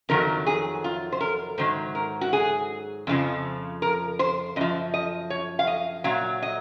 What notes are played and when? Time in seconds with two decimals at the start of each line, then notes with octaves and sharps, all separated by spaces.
0.09 F2 D#3 F#3 A#4
0.46 G#4
0.84 F4
1.12 C5
1.21 A#4
1.58 G#2 D#3 F#3 C5
1.95 A#4
2.21 F#4
2.33 G#4
3.07 F2 C#3 F3
3.82 A#4
4.19 C5
4.56 F#2 F3 D#5
4.94 D#5
5.30 C#5
5.59 F5
5.67 D#5
6.04 A#2 F#3 F5
6.43 D#5